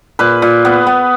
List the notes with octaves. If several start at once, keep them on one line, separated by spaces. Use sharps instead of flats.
A#2 B4
A#2
B3
B3